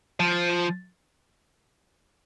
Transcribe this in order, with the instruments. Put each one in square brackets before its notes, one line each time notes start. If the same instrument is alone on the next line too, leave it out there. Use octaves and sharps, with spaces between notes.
[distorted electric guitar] F3